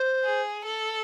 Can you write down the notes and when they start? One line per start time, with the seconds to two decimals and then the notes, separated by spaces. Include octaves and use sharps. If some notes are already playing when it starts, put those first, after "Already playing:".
Already playing: C5
0.24 G#4
0.65 A4